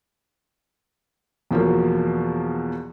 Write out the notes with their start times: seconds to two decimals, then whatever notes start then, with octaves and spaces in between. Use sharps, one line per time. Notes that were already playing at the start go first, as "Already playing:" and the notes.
1.51 E2 B2 F3 F#3 A#3